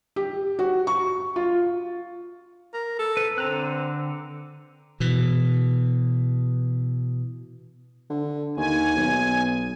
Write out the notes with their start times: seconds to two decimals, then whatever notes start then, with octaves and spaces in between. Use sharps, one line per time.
0.16 G4
0.59 F#4
0.87 C#6
1.36 F4
2.74 A#4
2.99 A4
3.17 B4
3.38 D3 C4 A#5 F#6
5.00 B2 E3
8.10 D3
8.57 D#2 G#5
8.96 B1